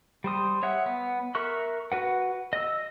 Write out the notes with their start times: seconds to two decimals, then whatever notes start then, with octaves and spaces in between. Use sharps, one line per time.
0.24 G3 C5 D#6
0.63 C#5 E5 F#5
0.86 B3
1.35 A#4 E5 C#6 F#6
1.92 F#4 B4 F#5
2.53 D#5 E6